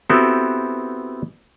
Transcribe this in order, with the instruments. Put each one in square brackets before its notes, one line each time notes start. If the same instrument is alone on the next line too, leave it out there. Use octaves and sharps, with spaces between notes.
[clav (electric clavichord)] B3 C4 E4 F#4 G4 A4